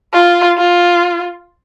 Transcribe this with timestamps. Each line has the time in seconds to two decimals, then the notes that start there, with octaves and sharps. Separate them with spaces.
0.13 F4
0.58 F4